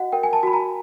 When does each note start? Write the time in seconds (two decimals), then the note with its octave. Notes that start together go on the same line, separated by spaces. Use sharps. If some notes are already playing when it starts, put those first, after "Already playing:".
Already playing: F#4 D#5 F#5
0.12 A#4 G5
0.23 G#5
0.33 A5
0.43 F#4 B5
0.53 A#5